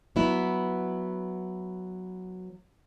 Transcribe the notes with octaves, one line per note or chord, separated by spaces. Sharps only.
F#3 B3 E4